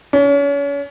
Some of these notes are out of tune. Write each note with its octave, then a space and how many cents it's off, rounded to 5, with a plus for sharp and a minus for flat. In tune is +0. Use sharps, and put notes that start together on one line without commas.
C#4 +35